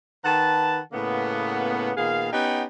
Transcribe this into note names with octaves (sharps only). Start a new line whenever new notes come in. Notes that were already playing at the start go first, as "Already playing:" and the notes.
D#3 B4 F#5 A5
A2 C#3 A#3 B3
A#2 D#3 B3 G#4 F5
B3 C#4 D#4 G4 F#5 G5